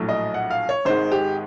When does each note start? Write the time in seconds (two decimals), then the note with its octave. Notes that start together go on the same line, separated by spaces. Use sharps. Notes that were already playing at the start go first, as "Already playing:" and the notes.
Already playing: A#1 A2 F#3 A3
0.09 D#5
0.34 F#5
0.51 F5
0.69 C#5
0.85 G#1 G#2 D#3 G#3 C5
1.12 G4